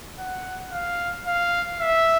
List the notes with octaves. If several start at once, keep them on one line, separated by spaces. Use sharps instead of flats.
F#5
F5
F5
E5